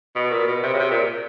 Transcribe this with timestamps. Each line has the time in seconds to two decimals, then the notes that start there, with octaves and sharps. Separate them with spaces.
0.16 B2
0.31 A#2
0.47 B2
0.63 C3
0.73 C#3
0.79 C3
0.91 A#2